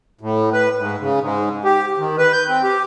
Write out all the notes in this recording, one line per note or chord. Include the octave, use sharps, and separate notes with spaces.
A2
B4
G#2
C#3
G#2
G4
D#3
B4
G6
C4
G4